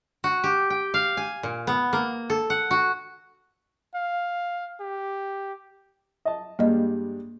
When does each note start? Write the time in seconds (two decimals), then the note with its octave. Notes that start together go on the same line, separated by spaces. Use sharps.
0.24 F#4
0.44 G4
0.70 G5
0.94 F5
1.17 G#5
1.43 A#2
1.67 B3
1.93 A#3
2.30 A4
2.50 F#5
2.71 F#4
3.94 F5
4.80 G4
6.25 D#5 A5
6.59 G2 G3 G#3 A#3 D#5